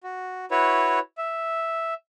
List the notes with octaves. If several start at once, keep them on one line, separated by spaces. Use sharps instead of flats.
F#4
E4 F#4 B4 C#5
E5